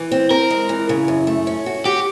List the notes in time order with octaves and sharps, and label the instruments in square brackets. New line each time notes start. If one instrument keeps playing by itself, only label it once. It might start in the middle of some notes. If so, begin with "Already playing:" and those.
Already playing: [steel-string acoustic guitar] E3
C4
[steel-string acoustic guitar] C4 [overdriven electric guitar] A#4
[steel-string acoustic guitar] G#3
E3
C#3
F#2
A3
C#4
F#4
[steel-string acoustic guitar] F#4 [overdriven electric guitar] G4